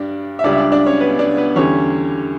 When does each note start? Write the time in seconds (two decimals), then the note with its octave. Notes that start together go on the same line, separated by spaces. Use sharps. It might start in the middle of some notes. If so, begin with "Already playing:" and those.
Already playing: G2 G3 D4 D5
0.39 E5
0.44 C#2 C#3 G3 D4 D5
0.53 E5
0.58 D4 D5
0.72 D4 D5
0.86 C#4 C#5
1.00 B3 B4
1.19 D4 D5
1.37 B3 B4
1.56 E2 D3 G3 C#4 C#5